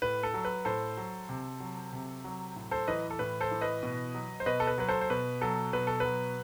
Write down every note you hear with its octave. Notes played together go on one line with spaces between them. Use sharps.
A2 B4
A4
F#3
B4
A2 A4 C5
F#3
C3
F#3
C3
F#3
A2
A4 C5
E3 B4 D#5
A4
A2 B4
A4 C5
E3
B4 D#5
B2
F#3
C5
B2 B4 D#5
A4
B4
F#3 B4
A4 C5
C5
B2 B4
F#3 A4
B2 B4
A4
F#3 B4